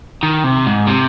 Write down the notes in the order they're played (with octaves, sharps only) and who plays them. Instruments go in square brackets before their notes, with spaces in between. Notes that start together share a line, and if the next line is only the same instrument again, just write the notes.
[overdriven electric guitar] D#3
C3
G#2
C3